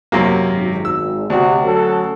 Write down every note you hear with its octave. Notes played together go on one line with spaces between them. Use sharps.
F#2 C3 A#3
G#1
E6
D2 C3 F#4
F#3 C#4 A4